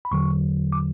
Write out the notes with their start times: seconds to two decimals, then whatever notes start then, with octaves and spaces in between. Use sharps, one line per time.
0.05 B5
0.11 E2 D3 F#3 C#6
0.72 D6